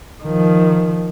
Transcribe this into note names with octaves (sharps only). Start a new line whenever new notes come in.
D#3 F3